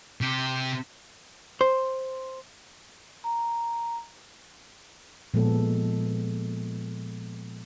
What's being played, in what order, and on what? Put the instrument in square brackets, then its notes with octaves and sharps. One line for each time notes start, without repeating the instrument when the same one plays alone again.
[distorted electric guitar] C3 G4
[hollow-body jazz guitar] C5
[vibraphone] A#5
[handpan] A#2 F3 G#3 B3 A4